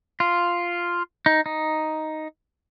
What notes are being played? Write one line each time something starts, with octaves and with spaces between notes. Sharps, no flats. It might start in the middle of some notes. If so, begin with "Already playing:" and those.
F4
D#4
D#4